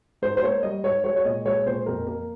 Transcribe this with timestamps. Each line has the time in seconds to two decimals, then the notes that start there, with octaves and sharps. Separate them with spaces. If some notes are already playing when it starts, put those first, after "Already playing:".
0.22 G#2 C5
0.37 C5
0.43 A#3 C#5
0.63 G3 D#5
0.83 G#2 C#5
1.04 G#3 C#5
1.16 C#5
1.25 A#2 D#5
1.46 G#3 C#5
1.66 A#2 C5
1.86 F2 A#4
2.07 A#3